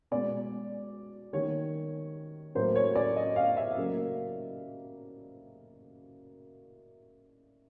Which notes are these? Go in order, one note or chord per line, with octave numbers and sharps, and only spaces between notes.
B2 G#3 D5
D#3 G3 A#3 C#5
A2 F#3 A#3 C5
C#5
D5
D#5
F5
E5
C#3 F#3 A#3